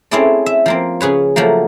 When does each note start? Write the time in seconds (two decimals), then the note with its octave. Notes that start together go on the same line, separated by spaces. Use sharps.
0.11 C4 C#4 E4 G#4 A4 D5
0.46 E5
0.66 F3 A#3 C4
1.01 C#3 G#4 B4 C#5
1.36 F3 F#3 A3 A#3